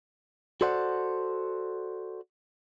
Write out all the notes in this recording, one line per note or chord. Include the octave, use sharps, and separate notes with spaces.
F#4 A4 C5 D5 F#5